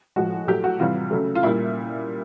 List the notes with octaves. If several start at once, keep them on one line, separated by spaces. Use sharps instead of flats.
A2 F3 G#3 F#4
A2 F#3 A3 G4
F#4
C3 E3 G3 F4
C#3 F#3 A3
F4
A#2 G3 E4